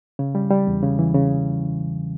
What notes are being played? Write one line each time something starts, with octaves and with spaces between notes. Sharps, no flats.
C#3
G3
G3
E2
C#3
E3
C#3